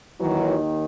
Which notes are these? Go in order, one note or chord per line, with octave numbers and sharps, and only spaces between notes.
D#2 D#3 E3 F#3